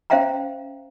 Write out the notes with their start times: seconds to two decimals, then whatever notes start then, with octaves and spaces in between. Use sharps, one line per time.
0.10 C#4 C5 E5 F5 G5 A#5